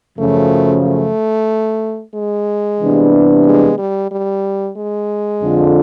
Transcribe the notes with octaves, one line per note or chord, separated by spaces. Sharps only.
F#2 C#3 F3 A3
A3
G#3
C3 E3 G3 B3 D4
G#3
G3
G3
G#3
F2 D3 F3